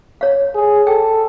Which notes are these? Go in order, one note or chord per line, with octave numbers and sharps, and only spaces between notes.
C#5 F5
G#4
A4 G5